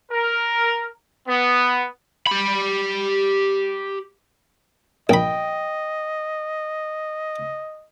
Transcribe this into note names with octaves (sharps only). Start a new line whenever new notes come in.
A#4
B3
G4 B5
A#1 D#5 G5 B5